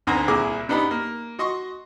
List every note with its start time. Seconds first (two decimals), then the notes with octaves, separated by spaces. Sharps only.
0.07 G#1 D2 B3 C4 G#5 A#5
0.28 C2 A#2 E4 G#4 E5 D6
0.68 F#2 B3 D4 D#4 G4 B5
0.91 A#3
1.39 F#4 D#5 C6 C#6